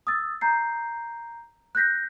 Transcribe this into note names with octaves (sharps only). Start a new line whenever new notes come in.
D#6 E6 A6
A#5 G6 C7
F#6 G6 A#6 B6